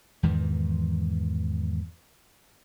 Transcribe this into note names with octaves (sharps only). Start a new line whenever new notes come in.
E2 G#2 D#3 E3